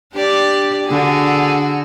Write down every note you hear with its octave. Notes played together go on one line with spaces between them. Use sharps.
D4 G4 D5
D3 F#4 G#4